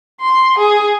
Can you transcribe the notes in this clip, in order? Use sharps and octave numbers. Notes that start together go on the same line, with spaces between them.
C6
G#4